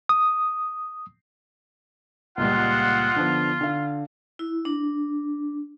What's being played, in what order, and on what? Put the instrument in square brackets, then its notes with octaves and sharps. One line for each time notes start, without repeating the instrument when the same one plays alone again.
[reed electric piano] D#6
[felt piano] C#2 A#2 G3 [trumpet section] C4 D#5 F#5 [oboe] F4
[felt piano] D3 F3 B3
D3 F5
[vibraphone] E4
D4